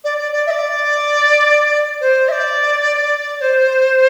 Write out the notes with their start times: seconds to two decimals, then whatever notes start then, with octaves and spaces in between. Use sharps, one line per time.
0.04 D5
0.17 D5
0.32 D5
0.46 E5
0.50 D5
2.00 C5
2.28 E5
2.31 D5
3.41 C5